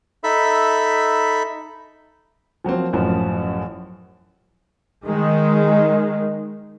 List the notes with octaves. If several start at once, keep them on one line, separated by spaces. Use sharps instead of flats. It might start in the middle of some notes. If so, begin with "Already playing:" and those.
D#4 A4 E5 B5
F3 F#3 A#3 C4
A1 F#2 F3 F#3
D#3 G#3